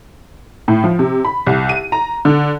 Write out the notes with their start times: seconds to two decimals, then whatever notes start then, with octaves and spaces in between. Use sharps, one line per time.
0.68 A2
0.84 F3
0.99 C3
1.25 B5
1.46 C2
1.69 D#7
1.92 A#5
2.25 D3